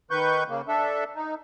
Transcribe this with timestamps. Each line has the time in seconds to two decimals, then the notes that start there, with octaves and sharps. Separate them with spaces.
0.11 D#3 B4 C#6 G6
0.48 C#3 A#3
0.68 D4 A4 E5
1.16 D#4